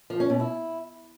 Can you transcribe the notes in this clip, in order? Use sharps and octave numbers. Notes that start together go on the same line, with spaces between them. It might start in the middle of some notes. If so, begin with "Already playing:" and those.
F3
C#4
B2
E4